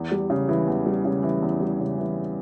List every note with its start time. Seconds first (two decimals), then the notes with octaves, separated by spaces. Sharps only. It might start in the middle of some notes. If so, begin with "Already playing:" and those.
Already playing: E2
0.11 G3
0.30 C#3
0.49 E3
0.68 E2
0.86 G3
1.05 C#3
1.23 E3
1.42 E2
1.60 G3
1.80 C#3
1.98 E3